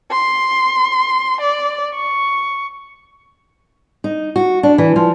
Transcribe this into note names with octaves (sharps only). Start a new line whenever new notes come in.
C6
D5
C#6
D#4
F#4
D4
E3
F3